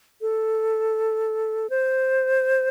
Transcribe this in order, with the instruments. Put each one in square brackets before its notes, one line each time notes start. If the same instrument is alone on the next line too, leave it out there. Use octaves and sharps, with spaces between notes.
[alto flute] A4
C5